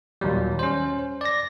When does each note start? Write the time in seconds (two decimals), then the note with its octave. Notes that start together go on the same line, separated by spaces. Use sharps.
0.21 D#2 A#2 F#3 G3
0.59 C#4 C5
1.21 D5 A#6